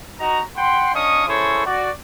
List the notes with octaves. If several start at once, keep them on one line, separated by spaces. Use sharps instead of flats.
D#4 F#4 D#5 A#5
F#5 G5 B5 C6
C#4 D4 D#5 F5 C#6 D#6
C#4 E4 G#4 A4 C5 C#5
F#4 D5